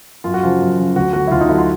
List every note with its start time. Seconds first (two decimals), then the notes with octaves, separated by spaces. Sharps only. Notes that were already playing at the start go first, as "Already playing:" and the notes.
0.24 F#2 F4
0.34 F#4
0.42 C#3 F3 F4
0.61 F#2
0.78 C#3 F3
0.96 D2 F#4
1.13 D3 F#3 F#4
1.27 E4
1.31 D2 F4
1.41 D#4
1.49 D3 F#3 E4
1.58 F4